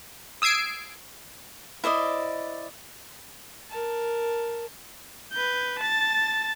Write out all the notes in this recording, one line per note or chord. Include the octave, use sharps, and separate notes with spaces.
D#6 E6 G#6 C7 D7
E4 C5 D5 D#5
A#4 A5
B4 G6
A5 A6